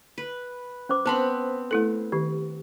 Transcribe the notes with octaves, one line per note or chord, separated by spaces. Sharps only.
B4
C#4 C5 D6
B3 C4 C5 A5 B5
A3 E4 A4
D#3 G4